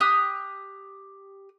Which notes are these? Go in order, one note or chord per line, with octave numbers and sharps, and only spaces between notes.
G4 D#6 F#6